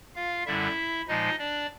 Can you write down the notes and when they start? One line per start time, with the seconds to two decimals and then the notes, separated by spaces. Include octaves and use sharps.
0.15 F4 F5
0.46 F#2 D3 G3 E4 E5
1.08 A#2 F3 G#3 D#4 D#5
1.39 D4 D5